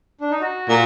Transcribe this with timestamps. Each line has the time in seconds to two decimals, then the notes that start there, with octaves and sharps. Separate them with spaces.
0.21 D4
0.31 D#4
0.41 F#4
0.69 A#2